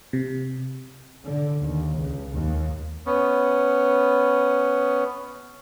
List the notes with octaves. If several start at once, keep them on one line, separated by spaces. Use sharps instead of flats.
C3
D3
D#2
C#2
D#2
B3 C#4